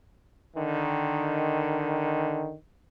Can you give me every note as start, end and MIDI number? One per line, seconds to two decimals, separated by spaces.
0.55 2.55 50
0.55 2.55 51